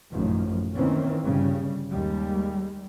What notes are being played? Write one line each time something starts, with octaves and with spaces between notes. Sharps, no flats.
A1 F#2 A#2 D#3 F3
D#3 E3 A#3 C4 C#4
G1 C#3 G3
D#2 G3 G#3